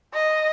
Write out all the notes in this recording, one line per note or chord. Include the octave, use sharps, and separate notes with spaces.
D#5